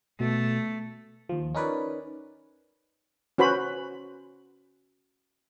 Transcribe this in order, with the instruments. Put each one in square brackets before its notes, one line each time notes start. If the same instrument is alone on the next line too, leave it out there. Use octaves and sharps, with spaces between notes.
[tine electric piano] B2 [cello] A3
[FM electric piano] D#2 F3
C#4 D#4 A#4 B4 C#5 D5
[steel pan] C#4 F#4 B4 C5 B5